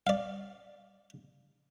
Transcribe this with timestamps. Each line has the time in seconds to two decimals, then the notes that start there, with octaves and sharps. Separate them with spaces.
0.07 D5 F5